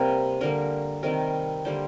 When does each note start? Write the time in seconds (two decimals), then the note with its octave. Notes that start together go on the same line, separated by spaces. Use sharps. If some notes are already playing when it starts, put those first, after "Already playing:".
Already playing: C3 G3 A#3 A#4
0.41 D3 G3 A#3 A#4
1.03 C3 D#3 G3 A#4
1.65 D3 G3 A#3 C5